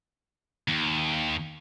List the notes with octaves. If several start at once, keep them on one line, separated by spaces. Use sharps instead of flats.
D#2